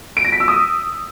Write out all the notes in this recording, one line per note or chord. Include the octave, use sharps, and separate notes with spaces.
D7
A#6
B6
E6
D#6